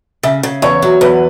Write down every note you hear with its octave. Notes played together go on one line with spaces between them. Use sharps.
C#3 E5
C#3
E2 C#5
F#3
E2 B4